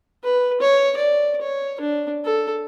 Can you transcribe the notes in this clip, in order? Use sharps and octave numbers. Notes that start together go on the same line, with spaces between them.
B4
C#5
D5
C#5
D4
A4